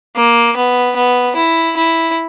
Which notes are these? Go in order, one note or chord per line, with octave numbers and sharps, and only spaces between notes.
A#3
B3
B3
E4
E4